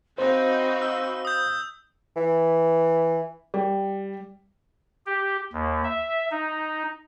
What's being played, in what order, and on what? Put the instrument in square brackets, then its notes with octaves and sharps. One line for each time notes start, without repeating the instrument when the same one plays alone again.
[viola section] C4 D#4 F#4 [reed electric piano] C5 [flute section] D#5 F5 B5
[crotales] E6
D#6 G6
[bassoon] E3
[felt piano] G3
[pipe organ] G4
D#2
E5
D#4